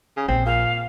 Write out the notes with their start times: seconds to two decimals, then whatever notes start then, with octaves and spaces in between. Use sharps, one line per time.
0.17 C#3
0.28 A#1 C4
0.46 A#2 F5